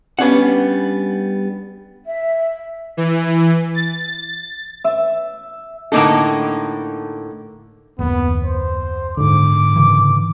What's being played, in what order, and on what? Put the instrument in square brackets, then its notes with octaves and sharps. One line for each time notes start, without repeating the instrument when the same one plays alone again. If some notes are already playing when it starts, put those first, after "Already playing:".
[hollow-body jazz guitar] G3 B3 C#4 D4 F#5
[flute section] E5
[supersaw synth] E3
A6
[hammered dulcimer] E5
[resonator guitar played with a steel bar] A2 D3 A#3 D#4 A4
[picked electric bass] F#1 D#2 [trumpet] B3
[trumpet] C5
[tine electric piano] G#2 D3 [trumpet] D6
[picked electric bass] C#3 E3